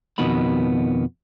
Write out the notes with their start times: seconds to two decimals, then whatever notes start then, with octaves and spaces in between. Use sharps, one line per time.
0.18 F2 B2 D#3 B3 B5